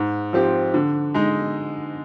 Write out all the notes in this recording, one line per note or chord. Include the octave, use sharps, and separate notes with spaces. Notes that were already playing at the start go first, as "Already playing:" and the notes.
Already playing: G#2
F3 C4 G4
D3
G#3 D#4